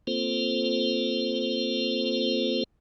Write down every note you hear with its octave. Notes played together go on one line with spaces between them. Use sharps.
A#3 C4 F4 A4 C5